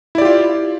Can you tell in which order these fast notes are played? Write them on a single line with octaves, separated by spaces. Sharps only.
E4 D5 G4 F4